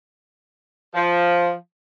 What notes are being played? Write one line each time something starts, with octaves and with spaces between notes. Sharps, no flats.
F3